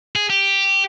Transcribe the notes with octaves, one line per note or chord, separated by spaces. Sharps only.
G#4
G4